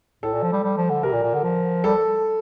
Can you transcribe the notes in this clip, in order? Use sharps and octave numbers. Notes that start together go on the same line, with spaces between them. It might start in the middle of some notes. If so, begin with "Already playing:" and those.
A2 A4
A#2
F3
G3
G3
F3
D3
C3 A#4
A#2
A#2
D3
F3
G3 A4